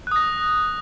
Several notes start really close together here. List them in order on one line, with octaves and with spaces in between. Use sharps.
F#6 D#6 A#6